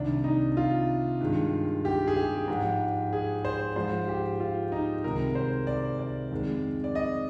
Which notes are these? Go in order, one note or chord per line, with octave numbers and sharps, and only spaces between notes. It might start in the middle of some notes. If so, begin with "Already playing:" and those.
Already playing: C2 C3 D#3 D4
D#4
F4
G2 D#3 G#3
G4
G#4
G4
G#2 F3 G#3
G#4
C5
G#2 F3 G#3 C5
G4
F4
D#4
C2 C3 D#3 G#3 A#4
C5
D5
D5
F2 D#3 G#3
D5
D#5